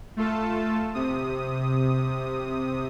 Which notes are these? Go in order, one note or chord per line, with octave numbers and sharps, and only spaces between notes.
A3 F4 A4 A5
C3 D#6